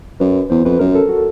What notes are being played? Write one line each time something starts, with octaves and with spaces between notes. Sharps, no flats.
F#2 B4
E2 C5
F2 B4
F#2 A#4
A4
F#4